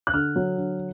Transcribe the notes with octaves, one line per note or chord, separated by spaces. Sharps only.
F#6
D3 F6
F#3
D3